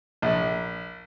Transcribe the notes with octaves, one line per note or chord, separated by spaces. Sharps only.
A#1